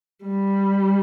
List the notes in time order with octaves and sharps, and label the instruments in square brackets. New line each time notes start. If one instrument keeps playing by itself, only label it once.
[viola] G3